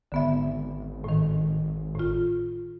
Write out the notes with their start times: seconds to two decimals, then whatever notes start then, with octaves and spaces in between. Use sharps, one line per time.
0.12 G#1 D3 B3 E5
1.04 A2 D#3
1.95 A2 F4